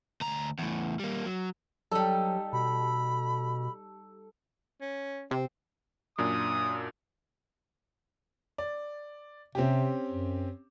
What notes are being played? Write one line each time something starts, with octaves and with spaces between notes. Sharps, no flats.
D2 A#5
E2 A2
G3 A#3
F#3
F#3 G3 D#4 A4
B2 B5
C#4
C3 C4
F#2 A#2 D4 D#6
D5
C3 C4 C#4 G4
F#2